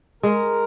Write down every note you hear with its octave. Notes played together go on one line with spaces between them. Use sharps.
G#3 A#4